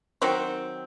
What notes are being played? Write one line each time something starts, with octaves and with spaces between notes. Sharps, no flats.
D#3 F#3 C4